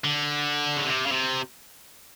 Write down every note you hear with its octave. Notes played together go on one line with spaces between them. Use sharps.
D3
C#3
C3
C#3
C3